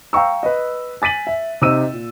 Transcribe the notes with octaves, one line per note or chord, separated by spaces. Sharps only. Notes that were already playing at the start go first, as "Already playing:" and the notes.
F5 G5 A#5 C#6 E6
B4 D#5
G#5 A6 B6 D#7 F#7
E5
C3 D#4 E6 D#7
A#2